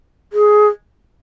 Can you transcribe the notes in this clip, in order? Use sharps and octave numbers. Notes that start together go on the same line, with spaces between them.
G#4